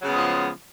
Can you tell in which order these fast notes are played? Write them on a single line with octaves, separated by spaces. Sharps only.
F#3 C#3 B3 G#3 F3